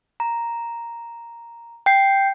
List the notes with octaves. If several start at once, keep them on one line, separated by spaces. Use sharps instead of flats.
A#5
G5 G6 C7